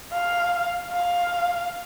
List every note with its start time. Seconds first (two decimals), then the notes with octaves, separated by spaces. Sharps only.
0.12 F5
0.92 F5